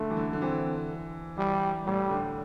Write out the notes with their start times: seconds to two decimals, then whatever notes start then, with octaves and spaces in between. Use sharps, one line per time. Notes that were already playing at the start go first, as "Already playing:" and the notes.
Already playing: D3 A3
0.10 E3
0.17 D3
0.33 D3
0.41 E3 C4
1.37 E3 G3
1.86 A2 G3
2.10 D3